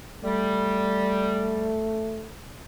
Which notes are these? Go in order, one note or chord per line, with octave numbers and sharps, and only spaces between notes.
G3 A3